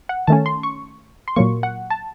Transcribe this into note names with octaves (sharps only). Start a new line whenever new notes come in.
F#5
D#3 A3 C#4 A5
C6
C#6
C6
A#2 F#3 A#3 C#6
F#5
A5